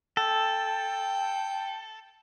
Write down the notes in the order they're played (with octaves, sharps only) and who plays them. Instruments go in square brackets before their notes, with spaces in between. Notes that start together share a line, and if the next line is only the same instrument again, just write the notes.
[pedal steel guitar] A4 [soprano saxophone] G5